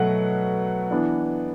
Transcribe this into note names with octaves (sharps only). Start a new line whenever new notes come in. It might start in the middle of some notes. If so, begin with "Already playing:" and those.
Already playing: B2 F#3 A3 F#5
E3 B3 D4